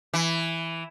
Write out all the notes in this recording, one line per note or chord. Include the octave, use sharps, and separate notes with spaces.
E3